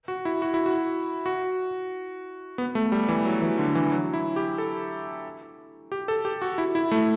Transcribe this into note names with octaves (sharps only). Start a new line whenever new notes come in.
F#4
E4
F#4
E4
F#4
F#4
B3
A3
G3
E3
F#3
E3
D3
E3
F#3
E4
G4
A4
G4
A4
G4
F#4
E4
E4
A3